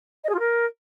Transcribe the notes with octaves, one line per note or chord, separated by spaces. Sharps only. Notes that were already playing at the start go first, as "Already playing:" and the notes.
D#5
G#4
F4
A#4